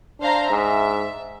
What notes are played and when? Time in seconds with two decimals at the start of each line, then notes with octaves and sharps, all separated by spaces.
0.20 D4 C5 F5 A#5
0.50 G#2 E5